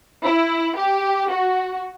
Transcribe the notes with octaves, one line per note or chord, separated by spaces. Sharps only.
E4
G4
F#4